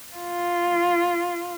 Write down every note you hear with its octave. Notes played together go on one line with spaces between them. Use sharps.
F4